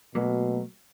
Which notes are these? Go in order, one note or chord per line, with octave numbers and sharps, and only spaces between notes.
B2 F#3 A3 A#3